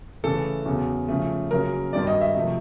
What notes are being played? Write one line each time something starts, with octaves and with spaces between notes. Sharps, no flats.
C#3 E3 A3 A4
E2 C#3 F#3
C#3 F3 A3
F#2 C#3 F#3 A#3 A#4
G2 D#3 F#3 D5
D#5
E5
C3 F3 A3